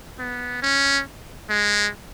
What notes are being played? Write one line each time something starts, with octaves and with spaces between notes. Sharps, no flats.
B3
C#4
G#3